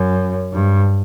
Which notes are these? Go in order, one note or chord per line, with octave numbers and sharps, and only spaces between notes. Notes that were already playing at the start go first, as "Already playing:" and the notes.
Already playing: F#2
G2